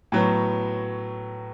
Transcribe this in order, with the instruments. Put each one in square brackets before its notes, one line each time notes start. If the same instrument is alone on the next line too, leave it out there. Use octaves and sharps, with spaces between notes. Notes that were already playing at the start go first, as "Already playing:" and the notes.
[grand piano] A2 F#3 B3